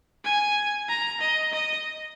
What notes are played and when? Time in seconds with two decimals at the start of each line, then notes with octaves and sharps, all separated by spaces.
0.25 G#5
0.89 A#5
1.21 D#5
1.53 D#5